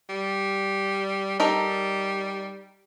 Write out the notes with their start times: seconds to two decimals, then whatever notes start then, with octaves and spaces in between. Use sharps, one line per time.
0.09 G3
1.40 G3 D#4 A4 A#4